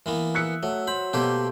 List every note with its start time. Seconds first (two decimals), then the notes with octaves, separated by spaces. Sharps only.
0.06 E3 A#3 B3
0.35 E5 D#6 F#6 B6 C#7
0.63 F#3 A3
0.87 C5 B5
1.13 B2 A3 A#3 G4 B4 C5 G5